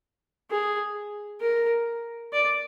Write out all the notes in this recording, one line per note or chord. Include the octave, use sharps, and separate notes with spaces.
G#4
A#4
D5